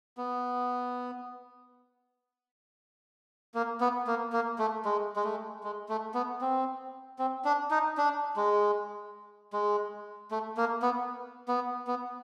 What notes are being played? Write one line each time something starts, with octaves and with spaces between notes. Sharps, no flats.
B3
A#3
B3
A#3
A#3
A3
G#3
G#3
A3
G#3
A3
B3
C4
C4
D4
D#4
D4
G#3
G#3
A3
A#3
B3
B3
B3